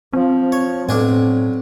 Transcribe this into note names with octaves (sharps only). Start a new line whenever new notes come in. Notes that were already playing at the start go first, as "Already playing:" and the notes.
F3 C4
C#5
B1 A2 C4 D4 G#5